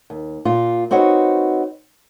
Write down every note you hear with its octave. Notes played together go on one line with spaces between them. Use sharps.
D#2
A#2 F4
C4 D#4 F#4 B4 C#5